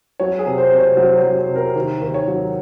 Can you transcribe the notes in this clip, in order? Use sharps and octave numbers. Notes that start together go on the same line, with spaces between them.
F#3 C#5
G#4
C3
C5
C3
C#5
F#3 C5
C#5
F#3
C5
C3
A#4
D#2 A#4
D#2
C#5
F#3